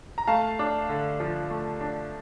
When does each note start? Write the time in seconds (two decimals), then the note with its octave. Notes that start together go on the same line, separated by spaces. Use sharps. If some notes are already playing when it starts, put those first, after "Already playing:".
0.18 A#5
0.28 A3 F5 A5
0.59 D4
0.89 D3
1.20 F3
1.51 A3
1.81 D4